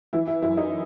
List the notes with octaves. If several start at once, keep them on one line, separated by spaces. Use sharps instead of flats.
E3 E4
E4
F#2 E4
D#4